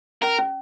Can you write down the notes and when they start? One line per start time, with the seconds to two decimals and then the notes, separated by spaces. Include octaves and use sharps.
0.23 C#4 A#4
0.38 C#4